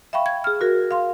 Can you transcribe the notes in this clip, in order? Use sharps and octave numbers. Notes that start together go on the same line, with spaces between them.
E5 F5 G5 B5 C#6
G#6
G#4 F6
F#4 A#4
F5 C6